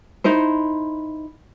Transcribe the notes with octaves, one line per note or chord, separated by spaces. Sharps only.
D#4 E4 C5